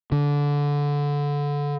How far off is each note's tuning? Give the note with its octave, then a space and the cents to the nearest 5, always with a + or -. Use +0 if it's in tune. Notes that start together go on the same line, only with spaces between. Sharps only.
D3 -20